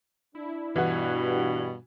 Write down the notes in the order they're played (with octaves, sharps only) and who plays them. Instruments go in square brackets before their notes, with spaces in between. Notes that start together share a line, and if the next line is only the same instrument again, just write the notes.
[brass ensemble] D4 [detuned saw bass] E4
[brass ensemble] G2 [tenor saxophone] B2 [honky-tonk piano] E3 F#4